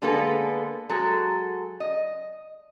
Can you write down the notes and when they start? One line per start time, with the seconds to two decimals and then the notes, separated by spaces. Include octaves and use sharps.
0.02 D3 G#3 A#3 B3 A4 B4
0.89 F#3 G#3 A4
1.80 D#5